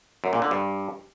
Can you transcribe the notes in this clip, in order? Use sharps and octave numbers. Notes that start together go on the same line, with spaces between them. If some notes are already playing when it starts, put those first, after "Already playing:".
F#2
A#2
D3
G2